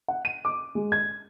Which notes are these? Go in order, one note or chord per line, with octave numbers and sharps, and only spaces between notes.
F#5
D#7
D6
G#3
G#6